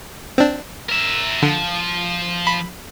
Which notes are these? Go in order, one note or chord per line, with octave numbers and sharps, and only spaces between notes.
C4 D4
A#4 E5
D3 F3
B5